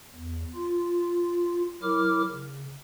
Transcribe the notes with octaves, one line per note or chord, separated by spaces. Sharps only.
E2
F4
F#3 E4 A#4 D6 F6
C#3